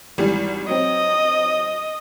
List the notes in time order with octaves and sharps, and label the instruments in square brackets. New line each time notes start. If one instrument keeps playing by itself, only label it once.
[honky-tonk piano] G#1 E3 G3
[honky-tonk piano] F#3 C4 [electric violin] D#5